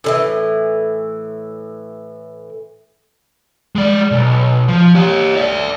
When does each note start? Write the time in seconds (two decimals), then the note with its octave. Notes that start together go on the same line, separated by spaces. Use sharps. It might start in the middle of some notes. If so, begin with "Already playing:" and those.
0.04 A2 D3 E3
3.76 G#3 D5
4.11 B1
4.68 F3
4.95 G4 C#5
5.36 D5 E5